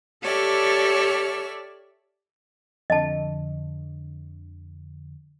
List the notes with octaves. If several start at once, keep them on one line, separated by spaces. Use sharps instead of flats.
G4 A4 C#5 D5 E5 F6
F2 D3 D#5 A5